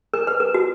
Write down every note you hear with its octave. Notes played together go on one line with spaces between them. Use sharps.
A#4
B4
A#4
F#4